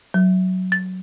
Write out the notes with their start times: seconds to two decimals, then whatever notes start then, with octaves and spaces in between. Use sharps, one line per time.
0.14 F#3
0.72 A6